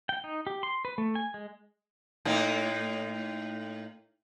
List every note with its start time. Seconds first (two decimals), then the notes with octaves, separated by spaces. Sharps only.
0.09 G5
0.24 D#4
0.47 G4
0.63 C6
0.85 B4
0.98 A3
1.15 G#5
1.34 G#3
2.25 A2 A#3 D#4